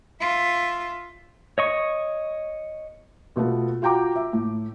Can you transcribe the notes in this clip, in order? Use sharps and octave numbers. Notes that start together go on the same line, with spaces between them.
F4 E5
C#5 D#5 C#6
B2 A3 B3 F4
F4 F#4 G5 A#5 D6
E5
A2